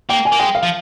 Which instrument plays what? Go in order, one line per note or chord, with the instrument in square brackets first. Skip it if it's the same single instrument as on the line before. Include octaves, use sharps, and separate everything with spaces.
[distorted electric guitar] A#3 [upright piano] G5
[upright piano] G#5
[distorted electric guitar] A#3
[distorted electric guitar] G#3 [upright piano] G5
[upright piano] F5
[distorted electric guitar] F3